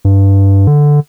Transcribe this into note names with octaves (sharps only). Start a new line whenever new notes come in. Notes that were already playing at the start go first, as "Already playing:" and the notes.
G2
D3